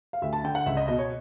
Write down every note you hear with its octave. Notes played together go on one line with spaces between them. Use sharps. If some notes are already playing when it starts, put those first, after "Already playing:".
F5
D2 E5
A5
D3 G5
F#5
C#2 E5
D#5
B2 D#5
C#5